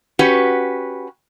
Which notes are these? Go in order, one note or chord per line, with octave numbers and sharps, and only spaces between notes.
C#4 F#4 G4 B4